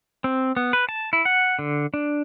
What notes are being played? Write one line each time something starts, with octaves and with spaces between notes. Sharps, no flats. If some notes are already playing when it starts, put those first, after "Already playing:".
C4
B3
B4
A5
E4
F#5
D3
D4